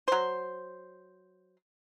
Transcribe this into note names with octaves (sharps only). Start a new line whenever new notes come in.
F#3 C5